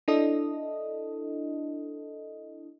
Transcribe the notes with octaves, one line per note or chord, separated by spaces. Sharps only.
D4 E4 A4 D#5